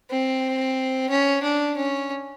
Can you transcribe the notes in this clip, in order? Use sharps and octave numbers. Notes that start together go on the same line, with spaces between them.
C4
C#4
D4
C#4